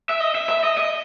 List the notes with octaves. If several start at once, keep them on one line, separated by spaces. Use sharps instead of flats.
E5
D#5
E5
E5
D#5
D#5